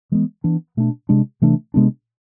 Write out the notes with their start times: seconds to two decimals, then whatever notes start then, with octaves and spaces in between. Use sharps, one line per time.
0.12 E3 G#3 B3
0.44 E3 B3 D4
0.77 B2 A3 D4
1.09 C3 G#3 D4
1.42 C3 E3 A3 D4
1.74 C3 G#3 B3 D4